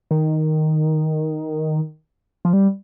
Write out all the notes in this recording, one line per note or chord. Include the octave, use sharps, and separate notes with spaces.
D#3
F3
G3